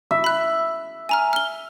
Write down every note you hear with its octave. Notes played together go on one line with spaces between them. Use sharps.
E5
B5 F#6
G#5 A#5 F6
F6 G7